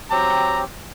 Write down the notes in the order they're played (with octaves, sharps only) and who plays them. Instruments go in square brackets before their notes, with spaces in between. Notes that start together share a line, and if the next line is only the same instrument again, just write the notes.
[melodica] F#3 C4 G4 [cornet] A#5